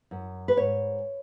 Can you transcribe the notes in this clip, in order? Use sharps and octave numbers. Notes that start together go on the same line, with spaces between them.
F#2
B4
G#2 C#5